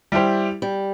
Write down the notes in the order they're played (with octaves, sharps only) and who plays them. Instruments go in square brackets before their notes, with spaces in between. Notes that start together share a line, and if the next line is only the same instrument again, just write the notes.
[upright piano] G3 E4 G4 C5
[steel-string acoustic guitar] G3